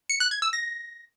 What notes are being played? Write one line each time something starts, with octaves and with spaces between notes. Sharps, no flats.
C#7
F#6
G#6
E6
A#6